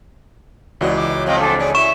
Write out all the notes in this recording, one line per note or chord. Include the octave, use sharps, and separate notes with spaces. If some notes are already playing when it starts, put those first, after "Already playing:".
C#2 E3 F#3 F#4 D5 D#5
D6
F3 A3 C4 D#5 F5 G5
D4 A4 G#5
C#4 G#4 D5 G#5
E4 E5 C#6 E7